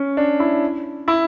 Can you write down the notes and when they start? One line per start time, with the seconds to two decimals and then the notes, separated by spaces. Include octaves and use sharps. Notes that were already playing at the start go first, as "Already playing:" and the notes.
Already playing: C#4
0.17 D4
0.40 E4
1.08 E4